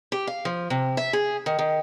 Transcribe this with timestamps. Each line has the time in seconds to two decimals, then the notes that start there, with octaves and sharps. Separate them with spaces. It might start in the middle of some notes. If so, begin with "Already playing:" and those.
0.12 G4
0.27 F5
0.45 F3
0.70 C3
0.97 E5
1.13 G#4
1.46 D#3
1.59 D#3